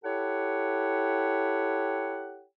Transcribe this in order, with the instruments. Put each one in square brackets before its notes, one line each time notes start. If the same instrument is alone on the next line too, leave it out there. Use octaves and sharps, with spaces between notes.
[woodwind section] E4 G4 A4 C#5 F#5 G5